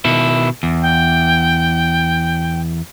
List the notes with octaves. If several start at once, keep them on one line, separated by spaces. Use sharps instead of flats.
B2 D#3 E4
E2
G5